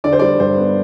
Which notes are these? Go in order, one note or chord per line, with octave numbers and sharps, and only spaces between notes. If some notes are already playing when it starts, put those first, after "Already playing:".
D3 D5
C5
G3 D5
G2 C5
B3